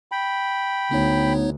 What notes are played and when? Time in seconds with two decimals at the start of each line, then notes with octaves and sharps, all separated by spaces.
0.12 G5 B5
0.91 D2 B3 D#4 C#5